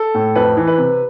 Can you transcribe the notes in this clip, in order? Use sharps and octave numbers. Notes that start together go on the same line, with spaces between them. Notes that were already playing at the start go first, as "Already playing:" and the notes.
Already playing: A4
A2
F2 B4
E3
B4
C3